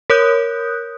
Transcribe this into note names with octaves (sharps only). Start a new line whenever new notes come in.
A#4 C#5 D#6 F#6 G6